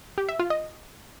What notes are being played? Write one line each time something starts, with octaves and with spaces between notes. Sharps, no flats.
G4
E5
F4
D#5